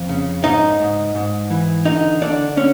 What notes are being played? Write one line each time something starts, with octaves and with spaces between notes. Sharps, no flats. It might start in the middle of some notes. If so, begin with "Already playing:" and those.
Already playing: F2
C#3
G#2 D#4 D#5
G#2
G#2
E3
D3 D#4 D#5
D3 D4 D5
D3 C#4